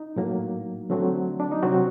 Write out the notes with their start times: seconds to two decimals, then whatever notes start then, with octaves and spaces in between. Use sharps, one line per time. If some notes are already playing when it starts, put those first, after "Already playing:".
Already playing: D#4
0.16 A2 F#3 A#3
0.90 D3 F#3 A3 C4
1.40 D4
1.51 D#4
1.63 C3 F#3 C4 F#4